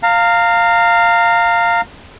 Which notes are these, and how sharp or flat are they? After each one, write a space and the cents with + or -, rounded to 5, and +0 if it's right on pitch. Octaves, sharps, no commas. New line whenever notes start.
F5 +0 A#5 -30